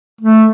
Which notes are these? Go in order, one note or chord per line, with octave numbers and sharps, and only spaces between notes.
A3